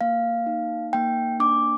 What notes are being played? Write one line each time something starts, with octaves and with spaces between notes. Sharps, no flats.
A#3 F5
D#4
A#3 G5
D4 D6